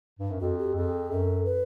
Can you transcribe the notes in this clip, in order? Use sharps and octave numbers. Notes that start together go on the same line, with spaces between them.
G2
F#2
F2 F#4
G4
F2 G#4
F#2 A4
B4